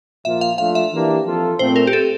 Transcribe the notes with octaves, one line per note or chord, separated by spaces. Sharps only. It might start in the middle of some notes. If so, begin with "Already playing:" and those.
A#2 F3 A#3 F4 E5
F5
F3 A3 D4 F4 F5
E5
E3 A#3 D4 G4
F3 C4 F4 A4
A#2 A3 C4 C5
A#4
G4
A4